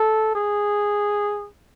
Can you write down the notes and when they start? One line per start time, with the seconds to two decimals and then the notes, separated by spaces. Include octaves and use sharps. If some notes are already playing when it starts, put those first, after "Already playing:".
Already playing: A4
0.35 G#4